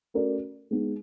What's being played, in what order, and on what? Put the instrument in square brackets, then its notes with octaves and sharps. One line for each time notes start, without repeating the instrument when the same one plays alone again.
[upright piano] A3 C#4 F#4 A#4 D5
G#3 B3 D#4